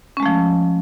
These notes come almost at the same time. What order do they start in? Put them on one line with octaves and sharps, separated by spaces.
C#4 G#3 A3 F3